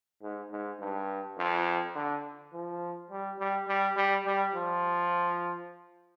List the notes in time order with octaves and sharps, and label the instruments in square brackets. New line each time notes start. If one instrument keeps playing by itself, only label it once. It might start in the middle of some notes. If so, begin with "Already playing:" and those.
[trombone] G#2
G#2
G2
F2
D3
F3
G3
G3
G3
G3
G3
F3